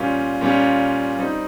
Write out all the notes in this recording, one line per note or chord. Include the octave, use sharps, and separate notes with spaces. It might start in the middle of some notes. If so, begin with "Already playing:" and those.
Already playing: A#2 G3 C#4 F4
A#2 G3 C#4 F4
G3 C4 D#4